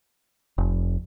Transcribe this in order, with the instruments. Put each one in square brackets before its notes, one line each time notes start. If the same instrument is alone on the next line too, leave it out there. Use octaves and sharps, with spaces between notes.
[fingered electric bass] F1